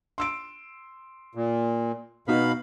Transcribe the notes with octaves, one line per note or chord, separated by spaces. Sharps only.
C6 E6 D7
A#2
B2 B3 D#4 F#4 F5 B5